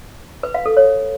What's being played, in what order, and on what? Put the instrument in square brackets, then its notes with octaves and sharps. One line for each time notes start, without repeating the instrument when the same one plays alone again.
[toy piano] B4
F5
A4
C#5